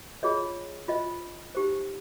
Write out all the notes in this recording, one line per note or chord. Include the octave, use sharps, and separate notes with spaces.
F4 G#4 C#5 D#5
F4 C5 D#5
D#4 G4 C5